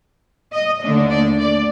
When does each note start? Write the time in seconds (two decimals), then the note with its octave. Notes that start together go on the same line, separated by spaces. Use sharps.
0.53 D#5
0.81 D#2 D3 A3 D4
1.10 D5
1.38 D5